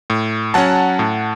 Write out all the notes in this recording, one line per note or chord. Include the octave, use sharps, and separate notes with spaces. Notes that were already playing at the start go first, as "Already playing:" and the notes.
A2
F#3 C#4 F#5 A5
A2